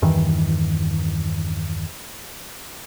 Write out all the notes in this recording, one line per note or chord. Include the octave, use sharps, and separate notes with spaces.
E2 G2 D#3 E3